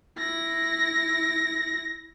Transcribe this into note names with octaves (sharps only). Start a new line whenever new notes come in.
E4 A#6